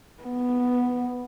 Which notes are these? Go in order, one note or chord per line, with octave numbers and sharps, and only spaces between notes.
B3